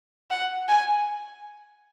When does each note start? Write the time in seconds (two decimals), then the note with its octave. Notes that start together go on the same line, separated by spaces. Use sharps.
0.30 F#5
0.68 G#5